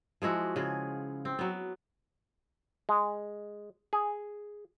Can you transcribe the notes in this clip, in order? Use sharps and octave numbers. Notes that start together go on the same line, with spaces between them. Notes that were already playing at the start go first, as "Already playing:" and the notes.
F3 G#3 E4 F#4
C#3 G#4
C4
F#3 B3
G#3
G#4